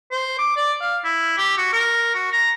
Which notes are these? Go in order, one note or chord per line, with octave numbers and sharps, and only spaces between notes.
C5
D6
D5
F5
E4
G4
F#4
A#4
F#4
A#5